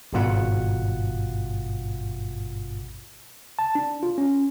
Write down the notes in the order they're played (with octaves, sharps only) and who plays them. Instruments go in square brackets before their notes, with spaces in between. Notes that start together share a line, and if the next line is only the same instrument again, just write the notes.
[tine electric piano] G#1 G2 B2 F4 F#5
A5
D4
F4
C#4